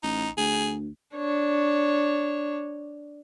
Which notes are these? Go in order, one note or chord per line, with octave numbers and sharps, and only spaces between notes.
A1 D#4
D2 G#4
D4 C#5